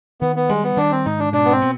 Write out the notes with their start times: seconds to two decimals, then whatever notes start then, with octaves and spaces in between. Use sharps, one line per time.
0.21 D#3 B3
0.36 B3
0.49 G3 G#3
0.64 B3
0.77 D#3 D4
0.92 C4
1.05 G#2 D#4
1.19 D4
1.33 B2 D4
1.45 B3
1.52 C4
1.62 B3